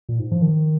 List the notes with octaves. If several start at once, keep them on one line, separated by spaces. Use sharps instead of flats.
A#2
G#2
F3
D#3